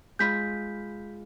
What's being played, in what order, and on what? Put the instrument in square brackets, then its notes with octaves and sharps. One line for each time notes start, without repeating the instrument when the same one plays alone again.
[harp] G#3 F4 B5 [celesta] G6 B6